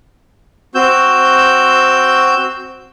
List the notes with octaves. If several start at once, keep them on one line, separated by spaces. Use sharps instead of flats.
C4 F#4 E6 G6